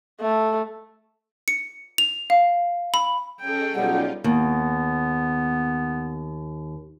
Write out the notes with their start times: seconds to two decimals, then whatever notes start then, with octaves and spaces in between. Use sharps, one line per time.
0.20 A3
1.48 C#7
1.98 F7
2.30 F5
2.94 B5
3.41 C#4 G#4 A4 D#5 G5
3.75 B1 G3 C#4 D#4 F4 F#5
4.24 D#2 B3